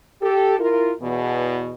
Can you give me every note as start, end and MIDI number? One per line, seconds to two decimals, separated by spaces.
0.22 0.54 67
0.22 0.54 69
0.59 0.92 64
0.59 0.92 65
0.59 0.92 70
1.00 1.75 40
1.00 1.75 47